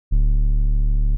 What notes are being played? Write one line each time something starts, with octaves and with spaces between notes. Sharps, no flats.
D1